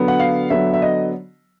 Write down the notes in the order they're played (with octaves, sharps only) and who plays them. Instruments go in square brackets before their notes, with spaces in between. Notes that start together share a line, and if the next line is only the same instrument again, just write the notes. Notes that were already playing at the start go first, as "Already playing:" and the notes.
Already playing: [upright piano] D3 F#3 B3
F#5
F5
D3 F#3 B3 E5
E5
D#5